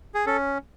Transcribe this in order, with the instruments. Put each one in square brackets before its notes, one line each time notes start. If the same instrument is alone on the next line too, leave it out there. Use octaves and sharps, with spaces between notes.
[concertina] G#4
C#4 A4